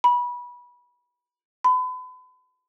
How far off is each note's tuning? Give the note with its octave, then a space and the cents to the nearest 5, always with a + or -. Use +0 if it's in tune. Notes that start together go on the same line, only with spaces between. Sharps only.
B5 -20
B5 +40